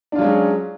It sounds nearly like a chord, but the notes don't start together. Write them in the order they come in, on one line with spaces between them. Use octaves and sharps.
D4 F4 F#3 G#3 C#4